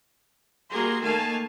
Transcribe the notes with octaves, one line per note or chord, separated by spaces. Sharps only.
G3 A#3 F#4 G#4 A#5 C6
D#3 A3 A#3 F5 G#5 A5